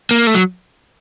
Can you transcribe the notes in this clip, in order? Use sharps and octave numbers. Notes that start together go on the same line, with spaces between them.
A#3
A3
F#3